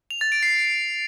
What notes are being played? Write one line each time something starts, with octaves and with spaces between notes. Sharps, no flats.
F7
A6
D7
C7